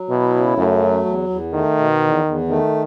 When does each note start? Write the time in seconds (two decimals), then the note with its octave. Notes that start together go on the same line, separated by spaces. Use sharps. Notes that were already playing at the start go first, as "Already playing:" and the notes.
Already playing: F#3
0.09 B2 E4
0.33 C#3
0.57 F#2 A3
0.81 F#3
1.05 E2
1.29 E2
1.53 D#3 A3
1.77 B2
2.02 E2
2.25 E2
2.49 D#3 A3